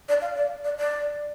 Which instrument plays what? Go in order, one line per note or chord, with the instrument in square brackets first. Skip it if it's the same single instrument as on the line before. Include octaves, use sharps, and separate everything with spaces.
[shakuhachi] D5
F5
D5
D5
D5